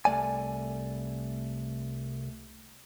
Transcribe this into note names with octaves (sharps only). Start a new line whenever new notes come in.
C2 A3 D5 G#5